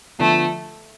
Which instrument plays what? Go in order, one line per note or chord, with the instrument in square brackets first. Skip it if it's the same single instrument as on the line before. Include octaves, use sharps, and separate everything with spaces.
[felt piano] D3 F3 B3 [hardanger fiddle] A3